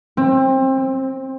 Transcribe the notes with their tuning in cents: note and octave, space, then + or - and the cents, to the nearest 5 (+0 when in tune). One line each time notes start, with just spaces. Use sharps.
C4 +25
C4 +5